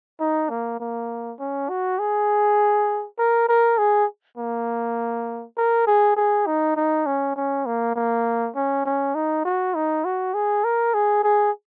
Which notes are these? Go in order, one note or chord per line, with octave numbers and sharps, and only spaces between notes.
D#4
A#3
A#3
C#4
F#4
G#4
A#4
A#4
G#4
A#3
A#4
G#4
G#4
D#4
D#4
C#4
C#4
A#3
A#3
C#4
C#4
D#4
F#4
D#4
F#4
G#4
A#4
G#4
G#4